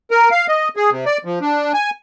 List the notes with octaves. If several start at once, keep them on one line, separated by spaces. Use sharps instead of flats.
A#4
F5
D#5
G#4
C3
D5
F3
D4
G#5